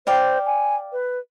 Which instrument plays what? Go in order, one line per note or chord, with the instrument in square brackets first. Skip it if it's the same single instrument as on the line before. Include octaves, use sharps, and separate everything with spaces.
[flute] C5 [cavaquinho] D5 F5 G5
[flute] G#5
B4